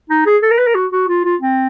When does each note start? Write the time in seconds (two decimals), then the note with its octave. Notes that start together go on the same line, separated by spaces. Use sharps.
0.10 D#4
0.26 G#4
0.43 A4
0.51 A#4
0.58 B4
0.67 A#4
0.75 F#4
0.92 F#4
1.08 F4
1.24 F4
1.41 C4